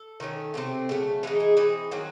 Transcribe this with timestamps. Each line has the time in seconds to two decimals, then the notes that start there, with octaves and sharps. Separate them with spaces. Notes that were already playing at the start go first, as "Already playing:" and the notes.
Already playing: A4
0.20 D#3 A3 C#4
0.54 C3 F#3 A3 C4
0.89 C#3 F#3 A3
1.23 E3 G#3 D#4 G#4
1.40 G#4
1.57 E3 C4 D#4 G#4
1.91 D#3 F#3 C4 G#4